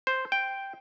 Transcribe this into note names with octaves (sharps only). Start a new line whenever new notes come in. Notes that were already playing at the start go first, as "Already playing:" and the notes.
C5
G5